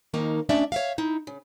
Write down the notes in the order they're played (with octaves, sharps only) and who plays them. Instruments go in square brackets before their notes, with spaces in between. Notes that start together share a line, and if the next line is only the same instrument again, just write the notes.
[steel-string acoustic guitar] D#3 F3 A#3 D#4
A3 C#4 D4 D5 E5
C#5 E5 F5
D#4 E4
C#3